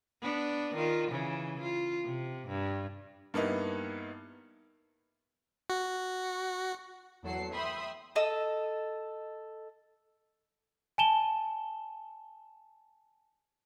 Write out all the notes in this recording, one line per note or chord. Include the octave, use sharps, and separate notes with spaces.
B3 D4
D#3 F4
C#3 E3
F4
C3
G2
G2 A#3 B3 D#4 E4
F#4
E2 F#3 A4 F#5 C7
E5 G5 B5 C6 D#6
A4 D#5 E6
G#5 A5 E7 G7